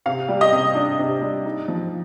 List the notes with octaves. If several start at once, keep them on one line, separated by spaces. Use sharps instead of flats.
C3 F5
G3
D#5
C3
D4
C3
G3
D#4
F3